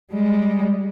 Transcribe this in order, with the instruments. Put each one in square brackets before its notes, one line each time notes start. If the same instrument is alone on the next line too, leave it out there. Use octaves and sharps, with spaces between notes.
[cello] G3 G#3